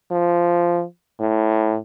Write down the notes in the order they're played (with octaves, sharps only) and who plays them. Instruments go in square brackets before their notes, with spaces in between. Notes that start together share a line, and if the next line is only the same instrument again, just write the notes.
[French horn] F3
A2